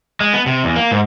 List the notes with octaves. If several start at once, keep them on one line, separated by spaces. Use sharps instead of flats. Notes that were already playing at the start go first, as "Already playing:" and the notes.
G#3
B3
C3
E2
A#3
G#2